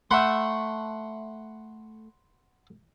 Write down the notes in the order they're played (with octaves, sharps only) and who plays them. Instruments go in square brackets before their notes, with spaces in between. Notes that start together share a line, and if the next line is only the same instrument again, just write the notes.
[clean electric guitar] A3 E5 [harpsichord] F#5 B5 C6